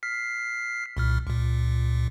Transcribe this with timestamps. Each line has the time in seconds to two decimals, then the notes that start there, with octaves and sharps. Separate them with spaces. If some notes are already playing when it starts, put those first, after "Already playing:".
0.03 F6 B6 C7
0.97 C2 A#2 F6
1.27 C#2 A#2